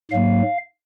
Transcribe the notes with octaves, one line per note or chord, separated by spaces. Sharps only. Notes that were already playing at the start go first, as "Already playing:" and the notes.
G#2 F#3 A#3 F5